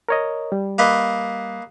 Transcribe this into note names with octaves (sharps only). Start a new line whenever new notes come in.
A#4 C#5 D#5
G3
A#3 B4 D#5